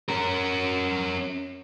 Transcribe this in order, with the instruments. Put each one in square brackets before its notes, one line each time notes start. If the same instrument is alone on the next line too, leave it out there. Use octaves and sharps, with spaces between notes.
[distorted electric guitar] C#4 A#4